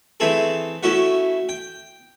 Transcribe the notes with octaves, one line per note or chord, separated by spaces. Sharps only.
E3 A3 C4 G#4 A4
A3 C#4 E4 F#4 E5 F#5
G5